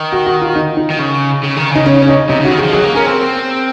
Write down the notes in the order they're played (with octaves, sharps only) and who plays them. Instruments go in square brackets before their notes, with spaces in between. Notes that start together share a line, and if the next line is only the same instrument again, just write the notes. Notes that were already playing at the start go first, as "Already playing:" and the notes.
Already playing: [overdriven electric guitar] D#3
[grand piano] F#4
F#4
F4
D#4
D#4
[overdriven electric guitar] D#3
C#3
C#3
D#3
[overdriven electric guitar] C#3 [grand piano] D#4
[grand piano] C#4
C#4
D#4
[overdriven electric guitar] C3 [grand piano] D#4
[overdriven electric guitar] C#3 [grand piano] F#4
[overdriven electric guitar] D#3
[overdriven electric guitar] F3 [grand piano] G#4
[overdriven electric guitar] F#3 [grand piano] G#4
[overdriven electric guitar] A#3
[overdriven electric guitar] C#4 [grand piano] A#4
[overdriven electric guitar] C4